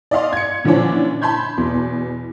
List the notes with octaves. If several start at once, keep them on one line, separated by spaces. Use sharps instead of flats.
D5 D#5 F5 C6
G#6 C#7
A#2 D3 E3 F3 C#4 D4
A5 B5 C6 G6 G#6
E2 B2